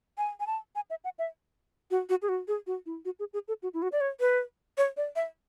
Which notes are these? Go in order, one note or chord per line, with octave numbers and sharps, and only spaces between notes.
G#5
G#5
A5
G#5
E5
F#5
E5
F#4
F#4
G#4
F#4
G#4
F#4
E4
F#4
G#4
G#4
A4
F#4
E4
F#4
D5
C#5
B4
C#5
D5
E5